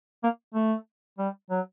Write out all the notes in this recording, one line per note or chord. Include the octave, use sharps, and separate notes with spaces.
A#3
A3
G3
F#3